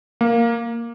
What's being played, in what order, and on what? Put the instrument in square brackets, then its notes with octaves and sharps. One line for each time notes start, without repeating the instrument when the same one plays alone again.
[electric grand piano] A#3